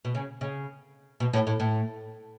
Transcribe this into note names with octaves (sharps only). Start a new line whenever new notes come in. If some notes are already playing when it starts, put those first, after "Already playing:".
B2
C#3
C#3
B2
A2
A2
A2